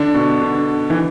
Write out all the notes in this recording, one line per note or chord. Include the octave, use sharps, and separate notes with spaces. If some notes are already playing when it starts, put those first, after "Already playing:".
Already playing: D3 D4
B2
D3
E3